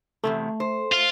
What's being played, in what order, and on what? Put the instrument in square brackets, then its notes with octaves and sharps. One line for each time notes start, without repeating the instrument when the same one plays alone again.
[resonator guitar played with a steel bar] E2 G#2 C3 [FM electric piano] A3
[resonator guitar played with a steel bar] C5
[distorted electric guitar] F4